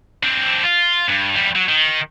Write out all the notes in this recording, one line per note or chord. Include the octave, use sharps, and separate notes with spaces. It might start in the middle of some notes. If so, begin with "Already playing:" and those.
C4 D4
F4
G2
E2 G3
F#3
D#3